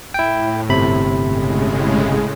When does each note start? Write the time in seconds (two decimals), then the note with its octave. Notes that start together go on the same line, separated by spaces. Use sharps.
0.14 A2 E4 G5
0.69 G1 C3 B5
1.24 A2 C#3 G#3